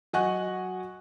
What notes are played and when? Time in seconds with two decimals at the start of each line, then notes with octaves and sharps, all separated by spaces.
0.13 F#3 D#5 F#5 G#5 C#6 F#6